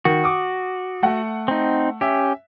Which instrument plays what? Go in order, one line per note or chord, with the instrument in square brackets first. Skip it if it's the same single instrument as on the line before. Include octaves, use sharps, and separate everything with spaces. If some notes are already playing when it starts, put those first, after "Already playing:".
[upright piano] D#3 [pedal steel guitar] F#4
[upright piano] D6 D#6
A3 F#5
[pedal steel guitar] C4 D#4
[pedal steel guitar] C#4 G4 [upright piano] E5